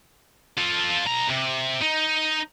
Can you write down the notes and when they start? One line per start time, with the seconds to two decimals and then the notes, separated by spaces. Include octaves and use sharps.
0.58 F4 A4
1.06 B2 A#5
1.30 C3
1.82 D#4